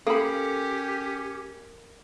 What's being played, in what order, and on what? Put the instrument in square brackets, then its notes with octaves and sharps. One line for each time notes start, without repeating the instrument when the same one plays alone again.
[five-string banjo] A#3 B5 [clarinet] C#4 [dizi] G4 [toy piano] A4